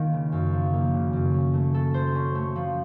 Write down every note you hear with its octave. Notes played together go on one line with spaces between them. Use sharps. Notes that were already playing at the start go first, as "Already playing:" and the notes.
Already playing: D#3 A#3 F4 A#4
C#3
F#2
F3
A#3
C#3
F#2
C#4
A3
A4
C5
C#4
A3
F3